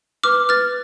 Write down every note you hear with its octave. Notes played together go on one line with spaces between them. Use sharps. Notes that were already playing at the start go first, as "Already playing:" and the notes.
B4 D6 F6
B4 F6 A6